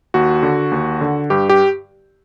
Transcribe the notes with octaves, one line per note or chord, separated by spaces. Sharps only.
D#2 F#4
D3
D#2
D3
G2 G4
G4